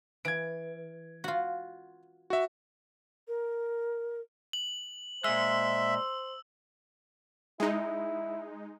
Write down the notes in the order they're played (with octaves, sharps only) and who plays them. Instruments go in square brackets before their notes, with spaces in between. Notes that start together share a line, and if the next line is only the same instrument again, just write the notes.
[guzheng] E3 [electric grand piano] G#6 D7
[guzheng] F4 F#4
[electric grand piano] F#4 E5
[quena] A#4
[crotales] F#7
[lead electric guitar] A#2 G#3 [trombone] C5 [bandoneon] E5 [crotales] E6
[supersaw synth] G#3 D#4 [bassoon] E4